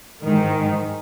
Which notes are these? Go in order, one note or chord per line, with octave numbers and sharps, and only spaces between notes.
G#2 D#3